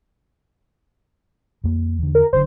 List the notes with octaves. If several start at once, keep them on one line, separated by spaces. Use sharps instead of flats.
F2 A#3
E2 D3
A#4
F#1 F#2 D3 C5